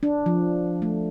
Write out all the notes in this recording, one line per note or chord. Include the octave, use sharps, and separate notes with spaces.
D4
F3
A3